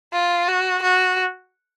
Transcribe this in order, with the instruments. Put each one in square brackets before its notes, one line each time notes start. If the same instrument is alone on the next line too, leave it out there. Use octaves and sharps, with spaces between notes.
[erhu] F4
F#4
F#4